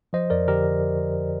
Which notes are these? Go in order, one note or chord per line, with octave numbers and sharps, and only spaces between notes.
F3 C5 D#5
F2 A#4 D5
D3 G4 A#4